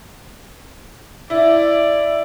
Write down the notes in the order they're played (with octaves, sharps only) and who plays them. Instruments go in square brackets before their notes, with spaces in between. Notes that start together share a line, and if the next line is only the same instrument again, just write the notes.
[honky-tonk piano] E4 [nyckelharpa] D5